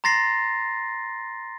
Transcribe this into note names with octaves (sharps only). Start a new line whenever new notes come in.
A#5 C6 A6 A#6 C7